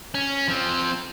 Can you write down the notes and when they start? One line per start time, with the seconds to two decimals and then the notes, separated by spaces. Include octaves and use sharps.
0.15 C#4
0.48 F3 C4